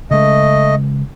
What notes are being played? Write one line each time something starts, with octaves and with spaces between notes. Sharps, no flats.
C#3 G#3 A3 D#5